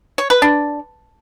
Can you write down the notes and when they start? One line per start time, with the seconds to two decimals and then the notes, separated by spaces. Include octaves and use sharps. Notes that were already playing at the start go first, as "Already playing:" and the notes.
0.18 C#5
0.30 B4
0.42 D4